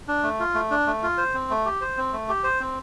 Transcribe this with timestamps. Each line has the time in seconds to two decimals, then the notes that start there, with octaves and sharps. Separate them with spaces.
0.08 D4
0.23 A3
0.40 F4
0.54 A3
0.71 D4
0.87 A3
1.03 F4
1.18 C5
1.34 C4
1.50 A3
1.65 G4
1.81 C5
1.98 C4
2.13 A3
2.29 G4
2.44 C5
2.60 C4